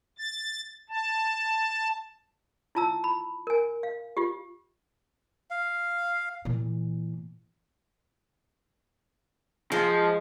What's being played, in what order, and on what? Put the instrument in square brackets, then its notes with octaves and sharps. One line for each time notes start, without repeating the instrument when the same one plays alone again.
[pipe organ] A6
A5
[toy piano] E4 F4 A5 A#5 E6
B5
A#4 G#5
F5
F4 G4
[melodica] F5
[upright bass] A#2 E3
[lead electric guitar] F3 [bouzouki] G#3